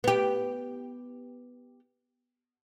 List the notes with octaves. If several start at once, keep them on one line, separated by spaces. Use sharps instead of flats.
B3 G4